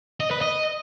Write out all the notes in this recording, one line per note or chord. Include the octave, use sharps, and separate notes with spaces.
D#5
B4
D#5